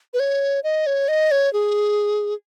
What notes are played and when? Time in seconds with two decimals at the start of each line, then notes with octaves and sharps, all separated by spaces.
0.14 B4
0.20 C#5
0.63 D#5
0.86 C#5
1.08 D#5
1.31 C#5
1.53 G#4